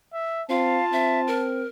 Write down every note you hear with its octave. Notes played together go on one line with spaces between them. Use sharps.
E5
C4 F4 F5 A5
C4 E5
A#4